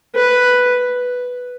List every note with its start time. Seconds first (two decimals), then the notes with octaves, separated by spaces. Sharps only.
0.15 B4